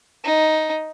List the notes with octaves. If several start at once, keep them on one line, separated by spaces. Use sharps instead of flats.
D#4